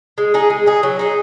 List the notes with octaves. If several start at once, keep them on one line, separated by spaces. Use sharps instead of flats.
G#3
D#4 G#4
G#3
D#4 G#4
F#3
D#4 G#4